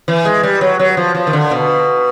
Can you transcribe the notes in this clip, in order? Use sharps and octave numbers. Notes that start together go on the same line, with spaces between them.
E3
G#3
G3
F#3
F#3
F3
F3
D#3
D3
B2